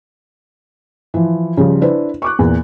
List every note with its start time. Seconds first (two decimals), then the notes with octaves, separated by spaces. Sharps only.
1.14 E3 F3
1.57 C#3 F3 G3
1.82 D4 E4 B4 C5
2.22 C#6 D6 F#6
2.39 E2 A#2